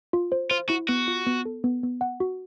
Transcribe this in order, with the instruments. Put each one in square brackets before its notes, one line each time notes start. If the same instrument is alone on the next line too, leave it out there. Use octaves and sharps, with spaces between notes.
[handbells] F4
C5
[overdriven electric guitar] F4 [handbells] C5
[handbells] E4 [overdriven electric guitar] F#4
[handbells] B3 [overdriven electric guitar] F#4
[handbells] F4
B3
A4
B3
B3
F#5
F#4